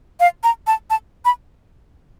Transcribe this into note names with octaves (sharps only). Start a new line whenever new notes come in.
F5
A#5
A5
A5
B5